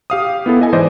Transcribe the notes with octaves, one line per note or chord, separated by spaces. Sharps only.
G4 F5 D#6
B3 E4 A4
A4 D#5 G#5
G#2 E3 C5 D5 D#5 D6